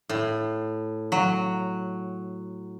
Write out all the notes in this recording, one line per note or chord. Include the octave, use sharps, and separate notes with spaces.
A2
F#3